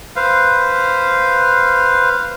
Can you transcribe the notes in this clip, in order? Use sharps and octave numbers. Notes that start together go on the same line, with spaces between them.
B4 C5 F5